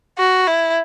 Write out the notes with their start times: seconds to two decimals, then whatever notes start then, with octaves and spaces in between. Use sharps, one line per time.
0.18 F#4
0.47 E4